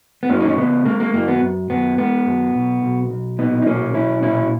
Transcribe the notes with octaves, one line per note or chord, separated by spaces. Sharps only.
B3
F#2 A#3 C#4
D#4
C#4
C#3 B3
G#3 A#3
A#3
F#2 A#3
B3
F#2
F#2 B3
G#3 B3
F#2
B1
B1
B1
A#2 B3 D#4
D#4
B1 A#3 C#4
B1 C#4 E4
A#2 C#4 E4